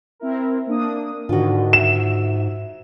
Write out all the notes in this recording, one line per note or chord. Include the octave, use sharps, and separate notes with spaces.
C4 E4 A#4
A#3 D4 D#6
G#2 D3 D#3 F4 F#4
E5 E7